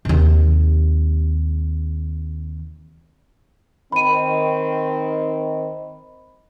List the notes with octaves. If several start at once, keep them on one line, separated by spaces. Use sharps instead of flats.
D#2 C3
D#3 C4 B5 D#7